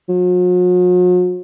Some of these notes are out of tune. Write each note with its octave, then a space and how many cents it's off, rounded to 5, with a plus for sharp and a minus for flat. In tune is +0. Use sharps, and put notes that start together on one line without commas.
F#3 -45